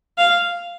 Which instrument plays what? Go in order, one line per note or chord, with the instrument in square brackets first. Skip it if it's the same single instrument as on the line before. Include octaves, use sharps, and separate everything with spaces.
[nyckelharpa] F5